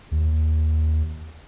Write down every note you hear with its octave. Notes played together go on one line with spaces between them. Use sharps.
D#2